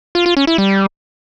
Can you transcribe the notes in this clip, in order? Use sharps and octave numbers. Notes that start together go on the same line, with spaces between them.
F4
F4
C#4
E4
G3